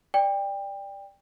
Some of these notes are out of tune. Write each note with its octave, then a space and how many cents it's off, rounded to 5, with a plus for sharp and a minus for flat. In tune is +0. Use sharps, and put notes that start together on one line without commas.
D5 +0 G5 +25